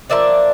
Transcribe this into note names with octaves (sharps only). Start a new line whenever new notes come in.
F3 A#3 D4 D5 E5